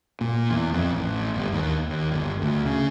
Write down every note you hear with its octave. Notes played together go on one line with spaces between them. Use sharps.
A#2
E2
F2
A1
G1
D#2
D#2
G1
D2
C#3